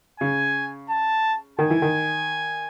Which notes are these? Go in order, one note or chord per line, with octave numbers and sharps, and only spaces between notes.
C#3 G#5
A5
D#3 G#5
E3
D#3